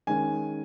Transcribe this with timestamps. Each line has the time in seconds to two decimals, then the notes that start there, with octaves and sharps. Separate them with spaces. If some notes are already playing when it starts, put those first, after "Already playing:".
0.07 D#3 G#3 C#4 G#5